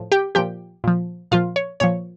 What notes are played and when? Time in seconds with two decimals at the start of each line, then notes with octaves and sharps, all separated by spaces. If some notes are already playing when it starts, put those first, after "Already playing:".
Already playing: A2 F3
0.12 G4 G5
0.35 A#2 F3 G4 G5
0.84 A#2 F3
1.32 A#2 F3 F4 F5
1.56 C#5
1.80 A#2 F3 C#5